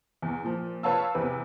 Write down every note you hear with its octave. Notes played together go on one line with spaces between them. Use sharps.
E2
A#2 F3
B4 C#5 F5 A5 E6
E2 C3 B4